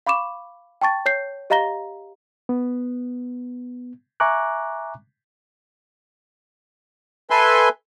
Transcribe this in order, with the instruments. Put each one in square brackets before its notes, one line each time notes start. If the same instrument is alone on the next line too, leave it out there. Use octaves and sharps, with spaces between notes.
[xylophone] F5 B5 C#6 D6 E7
G5 A5 C#6 A6
C#5 G6 C7
G4 D#5 F5 A#5 A#6 G7
[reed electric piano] B3
E5 G#5 A#5 C#6 D6 F#6
[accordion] A4 B4 E5 G#5 C6